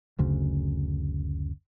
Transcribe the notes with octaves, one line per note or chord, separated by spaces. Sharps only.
F#1 D2 C#3